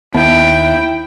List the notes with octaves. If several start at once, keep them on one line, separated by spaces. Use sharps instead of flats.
D#2 B3 E4 G5